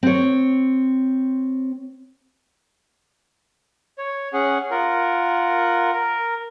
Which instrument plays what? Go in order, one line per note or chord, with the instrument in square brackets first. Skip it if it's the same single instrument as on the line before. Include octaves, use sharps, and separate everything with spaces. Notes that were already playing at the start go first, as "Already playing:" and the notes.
[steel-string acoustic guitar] C4 C#5
[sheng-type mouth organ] C#5
C#4 G#4 F#5
F4 A#4 F#5
A#4